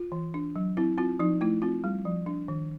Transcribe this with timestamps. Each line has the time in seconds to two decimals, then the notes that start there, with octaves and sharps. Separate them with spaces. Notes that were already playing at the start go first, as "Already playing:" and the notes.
Already playing: F4
0.12 E3
0.34 D4
0.56 F#3
0.77 C4 E4
0.98 C4 F4
1.19 F3 D#4
1.41 A3 E4
1.62 C4 F4
1.84 G3
2.05 F3
2.26 D4
2.48 D#3